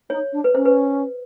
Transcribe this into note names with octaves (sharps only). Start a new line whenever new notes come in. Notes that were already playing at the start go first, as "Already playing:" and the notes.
D#4 C#5
D4
B4
C#4 C5
B4